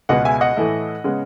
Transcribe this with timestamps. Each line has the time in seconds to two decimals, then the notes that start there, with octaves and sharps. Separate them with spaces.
0.09 C#2 B2 G#3 B3 D#5 F#5
0.25 E5 G#5
0.41 D#5 F#5
0.57 A2 E3 A3 E4
1.04 C#3 G#3 B3